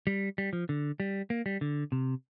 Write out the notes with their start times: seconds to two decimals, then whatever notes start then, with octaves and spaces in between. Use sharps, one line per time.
0.07 G3
0.38 G3
0.53 F3
0.69 D3
1.00 G3
1.30 A#3
1.46 G3
1.61 D3
1.92 C3